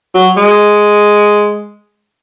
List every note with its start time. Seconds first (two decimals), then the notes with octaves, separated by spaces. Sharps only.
0.14 F#3
0.37 G#3